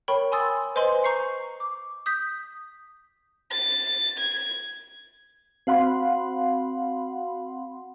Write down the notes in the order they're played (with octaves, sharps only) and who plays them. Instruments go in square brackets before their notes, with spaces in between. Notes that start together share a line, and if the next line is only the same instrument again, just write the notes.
[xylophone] A#4 C#5 G5 B5 C#6
G#5 C6 D#6 E6 A6
B4 C5 D#5 G#5 C6 F#7
A#5 C#6 G6 C7 C#7
D6
D#6 G6 B6
[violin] A6
G#6
[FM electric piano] C4 F#4 F5 F#5 B5 C6